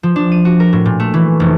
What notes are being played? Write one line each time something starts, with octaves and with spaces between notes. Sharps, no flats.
F3
D4
D#7
F#4
A#4
A2
A#2
A3
E3
F1